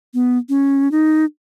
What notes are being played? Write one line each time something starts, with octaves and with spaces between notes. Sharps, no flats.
B3
C#4
D#4